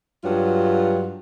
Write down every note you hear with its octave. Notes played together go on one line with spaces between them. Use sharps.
G2 F#3 F4